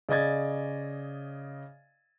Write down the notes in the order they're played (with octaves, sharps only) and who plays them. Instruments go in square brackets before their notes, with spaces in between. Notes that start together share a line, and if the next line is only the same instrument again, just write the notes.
[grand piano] C#3 D5 D#5 G#6 A6